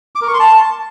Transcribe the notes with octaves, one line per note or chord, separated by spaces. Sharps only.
D6
A#4
C#6
C6
A5